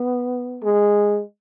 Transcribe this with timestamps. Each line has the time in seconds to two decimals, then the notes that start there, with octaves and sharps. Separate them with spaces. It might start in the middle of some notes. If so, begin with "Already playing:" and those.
Already playing: B3
0.63 G#3